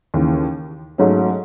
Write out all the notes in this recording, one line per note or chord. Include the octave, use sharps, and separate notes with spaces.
D#2 C#3 E3
G#2 F#3 A3 C#4